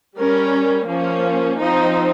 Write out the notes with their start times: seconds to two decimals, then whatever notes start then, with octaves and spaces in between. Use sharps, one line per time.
0.17 G3 C#4 A#4
0.88 F3 A#3 C#4
1.60 F3 C4 D#4